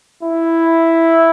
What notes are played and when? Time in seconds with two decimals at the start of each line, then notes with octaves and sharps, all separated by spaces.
0.23 E4